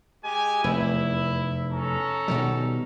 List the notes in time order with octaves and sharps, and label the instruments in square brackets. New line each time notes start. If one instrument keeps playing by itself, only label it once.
[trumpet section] G#3 G4 G#5
[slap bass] F1 E2 [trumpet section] E4
[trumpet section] C#4 A4 A#5
[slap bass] B2 D#3 G3